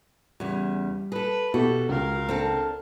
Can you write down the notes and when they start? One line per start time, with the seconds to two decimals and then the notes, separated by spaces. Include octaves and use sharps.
0.40 E2 C#3 G3
1.12 G#4 A4 B4
1.54 B2 E4 F#4 G4 A4
1.89 C#2 A#4 F5
2.29 C4 D4 A4